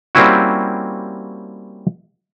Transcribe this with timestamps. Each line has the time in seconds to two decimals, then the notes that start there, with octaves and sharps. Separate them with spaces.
0.15 G3 A#3 C4 C#4 E4 F#4